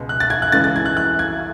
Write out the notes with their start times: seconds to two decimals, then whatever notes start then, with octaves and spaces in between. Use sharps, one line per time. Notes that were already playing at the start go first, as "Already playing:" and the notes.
Already playing: C#2 B2 G#3
0.09 F#6
0.20 A6
0.30 G#6
0.42 F#6
0.52 C#2 C#3 E3 G#3 A6
0.64 A6
0.76 G#6
0.86 F#6
0.97 F#6
1.19 G#6